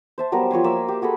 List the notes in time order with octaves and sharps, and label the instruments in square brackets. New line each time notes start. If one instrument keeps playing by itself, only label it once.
[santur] C5 E5 A5
F#3 G3 B3 A#4
F3 C#5 G#5 C6
A#3 D5 E5 E6
G4
F#4 G#4 A4 B5